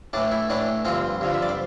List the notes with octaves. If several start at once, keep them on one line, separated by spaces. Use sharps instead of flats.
A2 E3 D4 D5
E4 E5
A2 E3 D4 D5
G2 D3 F3 C4 C5
G2 D3 F3
E5
D5
C5